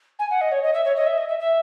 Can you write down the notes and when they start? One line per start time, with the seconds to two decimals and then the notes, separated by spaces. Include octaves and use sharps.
0.19 G#5
0.30 F#5
0.41 D#5
0.52 C#5
0.63 D#5
0.74 E5
0.85 C#5
0.96 D#5
1.06 E5
1.17 D#5
1.29 E5
1.39 E5